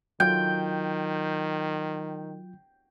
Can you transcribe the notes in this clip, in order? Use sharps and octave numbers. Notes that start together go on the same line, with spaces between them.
D#3 F#3 F4 G5